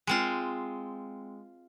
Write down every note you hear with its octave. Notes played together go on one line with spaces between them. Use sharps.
G#3 C4 F4